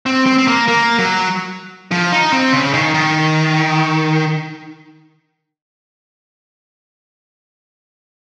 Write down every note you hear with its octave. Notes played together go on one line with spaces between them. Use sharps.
C4
C4
C4
A#3
A#3
F#3
F3
D#4
C4
C#3
D#3
D#3